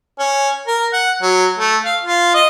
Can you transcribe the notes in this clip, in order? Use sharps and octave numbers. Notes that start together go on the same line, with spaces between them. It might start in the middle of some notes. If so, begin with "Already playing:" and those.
C#4
A#4
F#5
F#3
A3
F5
F4
D#5